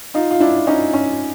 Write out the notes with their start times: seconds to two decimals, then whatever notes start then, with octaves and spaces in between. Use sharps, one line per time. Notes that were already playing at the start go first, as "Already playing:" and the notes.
0.14 D#4 F4
0.31 F4
0.40 D4 E4
0.67 C#4 D#4
0.93 C#4